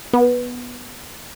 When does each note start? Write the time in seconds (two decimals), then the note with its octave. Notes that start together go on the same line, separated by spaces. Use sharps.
0.13 B3